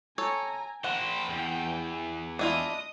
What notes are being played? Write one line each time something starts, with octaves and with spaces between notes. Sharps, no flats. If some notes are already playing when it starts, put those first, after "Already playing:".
A4 C#5 G#5 A#5
A#4 C5 F#5 G5
E2
D4 E4 F4 D#5 D#6